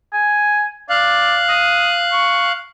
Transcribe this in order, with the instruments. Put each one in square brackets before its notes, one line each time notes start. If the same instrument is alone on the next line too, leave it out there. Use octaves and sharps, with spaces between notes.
[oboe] G#5
[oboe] D5 [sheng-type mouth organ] F5 F#6
[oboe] D#6
C#6